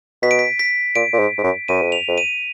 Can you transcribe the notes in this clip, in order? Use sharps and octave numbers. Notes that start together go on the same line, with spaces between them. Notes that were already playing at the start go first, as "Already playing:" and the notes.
B2 B6
D7
B6
B6
A#2 D7
A#2
G#2
G#2
F#2
F#2 D#7
F2
F7
F2
D#7